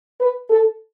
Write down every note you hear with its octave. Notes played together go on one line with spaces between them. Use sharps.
B4
A4